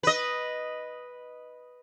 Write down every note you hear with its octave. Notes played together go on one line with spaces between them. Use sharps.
B4 D#5